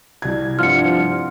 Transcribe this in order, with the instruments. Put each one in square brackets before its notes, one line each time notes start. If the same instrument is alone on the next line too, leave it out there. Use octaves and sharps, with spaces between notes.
[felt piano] C2 G#6
[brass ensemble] G2 C3 F3 [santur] F4 F#5 [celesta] F6 C#7